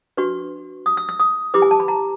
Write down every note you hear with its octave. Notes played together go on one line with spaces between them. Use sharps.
D4 F#4 B4 C#6
D#6
E6
E6
D#6
E4 G4 B4 D6
G#5
A5
B5
A#5